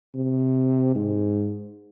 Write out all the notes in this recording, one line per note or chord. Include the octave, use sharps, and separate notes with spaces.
C3
G#2